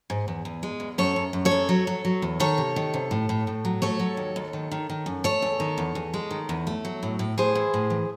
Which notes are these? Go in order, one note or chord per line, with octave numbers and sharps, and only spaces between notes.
G#2
E2
E2
G#3
E2
F#2 A4 C#5
F#2
F#2
A4 C#5
F#2
F#3
F#3
F#3
E2
D#3 A4 C#5
C3
D#3
C3
A2
A2
A2
F#3
A3 A4 C#5
F#3
D#2
D#2
D#3
D#3
D#3
F#2
A3 A4 C#5
E2
D#3
E2
E2
G#3
D#3
E2
A3
F#3
A2
A2
A2 G#4 C5
E3
A2
E3